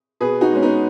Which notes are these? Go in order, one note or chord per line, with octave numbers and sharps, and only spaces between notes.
B2 G#4 B4
D#4 F#4
G#3 B3 C#4
B3 D#4